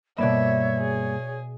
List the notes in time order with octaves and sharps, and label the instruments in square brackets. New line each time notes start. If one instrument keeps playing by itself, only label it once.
[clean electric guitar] G2 A#3 B5 [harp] B2 D5 E7 [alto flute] C#5 [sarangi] E5
[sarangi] G#4